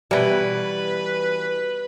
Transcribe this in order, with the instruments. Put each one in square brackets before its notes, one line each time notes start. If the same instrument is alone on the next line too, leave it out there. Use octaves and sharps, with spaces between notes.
[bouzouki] B2 E3 [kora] G3 [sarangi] B4